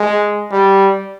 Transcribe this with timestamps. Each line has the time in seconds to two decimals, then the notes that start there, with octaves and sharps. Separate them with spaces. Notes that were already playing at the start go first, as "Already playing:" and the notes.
Already playing: G#3
0.52 G3